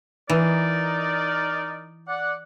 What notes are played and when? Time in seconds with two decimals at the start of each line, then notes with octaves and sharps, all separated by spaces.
0.30 E3 D#4 A#4 D5
2.08 D5 F#5